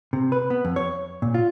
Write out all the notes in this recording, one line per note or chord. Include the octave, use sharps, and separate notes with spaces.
C3
B4
B3
F2
C#5
A#2
F4